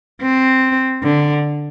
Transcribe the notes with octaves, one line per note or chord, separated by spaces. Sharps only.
C4
D3